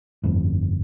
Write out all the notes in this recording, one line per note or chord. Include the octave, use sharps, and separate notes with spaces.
G1 F2 A2